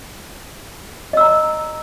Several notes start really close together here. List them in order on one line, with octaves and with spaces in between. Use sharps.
D#5 E6 A#5